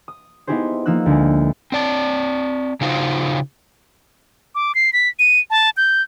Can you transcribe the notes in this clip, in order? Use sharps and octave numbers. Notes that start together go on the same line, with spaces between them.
D#6
B3 D#4 E4 G4 G#4 C5
F3 A#3 D#4 E6 F#6
D2 G#3
C4 D5 A5
C#3 D#4 F4 F#4 C5
D6
C7
B6
D#7
A5
G6